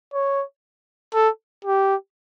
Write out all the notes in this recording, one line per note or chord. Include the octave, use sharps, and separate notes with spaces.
C#5
A4
G4